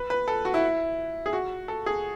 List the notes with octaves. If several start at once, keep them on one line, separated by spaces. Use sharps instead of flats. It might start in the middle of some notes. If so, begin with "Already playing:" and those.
Already playing: B4
B4
A4
F#4
E4
G#4
F#4
A4
G#4